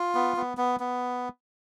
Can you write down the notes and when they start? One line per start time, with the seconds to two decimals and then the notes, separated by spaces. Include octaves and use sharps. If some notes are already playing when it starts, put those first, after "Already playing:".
Already playing: F4
0.15 B3
0.37 B3
0.57 B3
0.80 B3